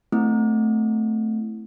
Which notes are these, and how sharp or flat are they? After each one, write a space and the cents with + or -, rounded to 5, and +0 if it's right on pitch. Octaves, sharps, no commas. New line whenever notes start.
A3 +0 C4 -15 E4 +0